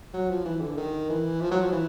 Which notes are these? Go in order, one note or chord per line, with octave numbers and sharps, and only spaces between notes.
F#3
F3
E3
D3
D#3
E3
F3
F#3
F3
E3